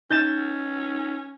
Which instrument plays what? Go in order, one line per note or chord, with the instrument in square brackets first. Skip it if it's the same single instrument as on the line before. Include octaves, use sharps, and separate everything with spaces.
[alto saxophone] C#4 [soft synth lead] D#4 [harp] G6 A6 E7